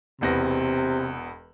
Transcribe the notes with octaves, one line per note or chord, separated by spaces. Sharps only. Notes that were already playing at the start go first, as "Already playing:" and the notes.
E1 E2 C3 A#6